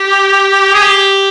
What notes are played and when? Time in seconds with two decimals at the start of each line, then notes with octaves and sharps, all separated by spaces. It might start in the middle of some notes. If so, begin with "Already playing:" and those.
Already playing: G4
0.74 G#4
0.82 G4